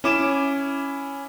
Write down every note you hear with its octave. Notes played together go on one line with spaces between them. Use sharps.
C#4 E4 D6 E7